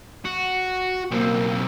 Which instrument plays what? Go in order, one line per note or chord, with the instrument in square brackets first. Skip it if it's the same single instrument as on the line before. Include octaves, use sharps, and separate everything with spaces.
[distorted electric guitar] F#4
[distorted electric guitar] B1 C4 [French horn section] A#3